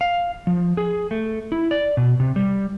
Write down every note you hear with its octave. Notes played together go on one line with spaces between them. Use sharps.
F5
F3
G#4
A3
E4
D5
B2
C3
G3